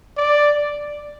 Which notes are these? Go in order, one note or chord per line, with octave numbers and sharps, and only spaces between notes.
D5